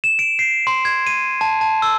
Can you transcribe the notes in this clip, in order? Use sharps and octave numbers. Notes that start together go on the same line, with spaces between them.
E7
D7
C7
C6
G#6
D#7
A5
A5
E6